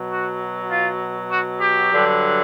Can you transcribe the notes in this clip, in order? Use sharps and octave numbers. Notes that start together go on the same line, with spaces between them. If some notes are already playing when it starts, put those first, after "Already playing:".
Already playing: B2 F#3
F#4
F4
F#4
G4
G2 D3 F#3